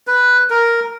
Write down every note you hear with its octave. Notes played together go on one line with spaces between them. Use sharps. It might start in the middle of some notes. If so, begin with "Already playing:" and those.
B4
A#4